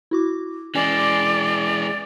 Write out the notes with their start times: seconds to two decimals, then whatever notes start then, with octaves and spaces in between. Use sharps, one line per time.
0.11 E4 F#4 D6
0.75 E3 G#3 C#4 D5 G#5